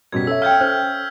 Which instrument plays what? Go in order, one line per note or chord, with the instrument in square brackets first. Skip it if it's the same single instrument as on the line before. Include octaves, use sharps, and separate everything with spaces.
[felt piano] F#2 B2 G3 [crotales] G#6 B6
[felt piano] C#4 [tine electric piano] A4 E5 [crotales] E6
[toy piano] F5 G5 [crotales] F6 G6 G#6
[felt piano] C#4 [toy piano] C5